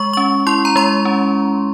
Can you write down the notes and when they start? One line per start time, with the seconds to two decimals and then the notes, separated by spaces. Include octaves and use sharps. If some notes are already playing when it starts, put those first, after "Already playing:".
Already playing: G#3 C#6
0.13 C#4 C#6
0.47 E4 C6
0.65 A#5
0.76 G#3 C6
1.05 C#4